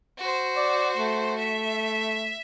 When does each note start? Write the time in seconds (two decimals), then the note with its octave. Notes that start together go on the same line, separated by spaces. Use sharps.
0.18 F#4 C5
0.56 D5
0.97 A3
1.39 E5